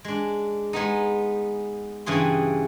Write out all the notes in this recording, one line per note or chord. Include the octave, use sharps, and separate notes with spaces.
G#3 D4
G#3 B3 D#4
G2 C#3 E3 G#4 C6